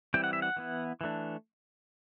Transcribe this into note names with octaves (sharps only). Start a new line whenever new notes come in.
E3 G3 C4 E4 G5
F#5
E5
F#5
E3 B3 E4
E3 A3 D4